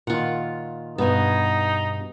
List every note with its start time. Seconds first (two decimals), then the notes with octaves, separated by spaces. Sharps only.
0.07 A#2 D#3 F4 F#5
0.98 G2 B2 B3 D#4 G#5